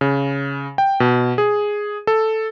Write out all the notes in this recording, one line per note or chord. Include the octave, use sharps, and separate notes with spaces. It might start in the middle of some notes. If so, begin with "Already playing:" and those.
C#3
G5
B2
G#4
A4